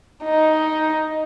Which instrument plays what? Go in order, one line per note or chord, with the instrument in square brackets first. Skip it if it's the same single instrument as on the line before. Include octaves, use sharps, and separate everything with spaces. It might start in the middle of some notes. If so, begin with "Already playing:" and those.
[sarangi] D#4